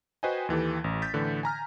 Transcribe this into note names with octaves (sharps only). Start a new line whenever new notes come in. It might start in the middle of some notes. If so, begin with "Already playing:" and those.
F#4 B4 C5 D#5 G5 G#5
D#2 E3 G4 A4
A1
G6 A6 B6
A2 D3 E3
G#5 A#5 F6